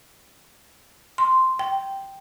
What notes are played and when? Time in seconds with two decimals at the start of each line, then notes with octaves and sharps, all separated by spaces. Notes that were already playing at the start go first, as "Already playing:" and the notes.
1.18 C6
1.59 G5